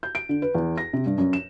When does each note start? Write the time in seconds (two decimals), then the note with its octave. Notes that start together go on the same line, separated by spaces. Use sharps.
0.03 G6
0.15 D7
0.29 D3
0.42 B4
0.55 E2
0.78 A#6
0.93 C3
1.06 G2
1.18 F#2
1.33 E7